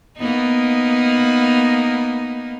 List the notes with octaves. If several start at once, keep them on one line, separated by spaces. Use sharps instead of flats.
A#3 B3 D#4